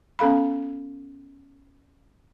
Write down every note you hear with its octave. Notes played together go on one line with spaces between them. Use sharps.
B3 C#4 A4 F5 B5